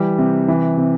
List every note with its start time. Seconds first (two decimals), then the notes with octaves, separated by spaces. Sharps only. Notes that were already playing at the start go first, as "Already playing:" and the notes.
Already playing: E3 G3
0.18 C3
0.48 E3
0.77 C3